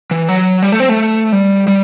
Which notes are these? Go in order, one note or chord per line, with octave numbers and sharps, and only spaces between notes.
E3
F#3
G3
A3
C4
A3
G3
G3